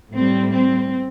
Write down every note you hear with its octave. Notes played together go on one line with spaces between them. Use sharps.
A2 G3 C4
C4